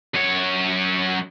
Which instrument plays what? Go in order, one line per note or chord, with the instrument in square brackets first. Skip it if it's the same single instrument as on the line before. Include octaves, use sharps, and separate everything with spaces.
[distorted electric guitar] F#2 C#5